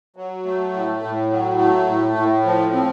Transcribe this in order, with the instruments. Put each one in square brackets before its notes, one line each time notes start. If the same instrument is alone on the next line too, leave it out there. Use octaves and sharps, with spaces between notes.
[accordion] F#3
A3
A2
A2
F#3
A3
A2
A2
F3
C4